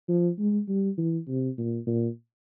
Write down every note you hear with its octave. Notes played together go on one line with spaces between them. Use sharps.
F3
G#3
G3
E3
C3
A#2
A#2